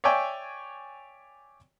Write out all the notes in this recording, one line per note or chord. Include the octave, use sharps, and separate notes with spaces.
C#5 D5 E5 G5 G#5